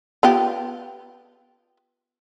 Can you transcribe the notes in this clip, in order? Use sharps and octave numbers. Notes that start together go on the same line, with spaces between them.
B3 F4 G4